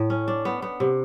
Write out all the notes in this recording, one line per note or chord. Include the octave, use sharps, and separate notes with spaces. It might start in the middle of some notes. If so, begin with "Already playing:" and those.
Already playing: A2
C#4
D4
B3
B3
C3